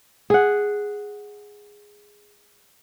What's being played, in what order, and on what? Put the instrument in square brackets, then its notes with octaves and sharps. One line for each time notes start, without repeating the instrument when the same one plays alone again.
[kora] G#4 F#5